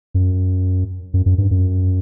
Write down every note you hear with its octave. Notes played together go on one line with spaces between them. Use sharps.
F#2
F#2
F#2
G2
F#2